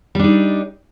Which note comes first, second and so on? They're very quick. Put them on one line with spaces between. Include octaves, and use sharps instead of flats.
G3 D4 D#4